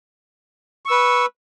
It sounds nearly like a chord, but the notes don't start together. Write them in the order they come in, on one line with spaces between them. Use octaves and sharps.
C#6 E6 B4